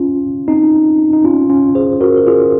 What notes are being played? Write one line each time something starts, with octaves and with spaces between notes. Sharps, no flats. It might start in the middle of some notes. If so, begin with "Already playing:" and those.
Already playing: C#4 F4
C4 D#4
D#4
C#4 F4
C#4 F4
G#4 C5
F#4 A#4
A#4
F4 G#4